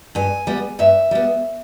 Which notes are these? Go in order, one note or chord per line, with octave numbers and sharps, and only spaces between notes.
G2 G#5
G3 B3
G2 E5
G3 B3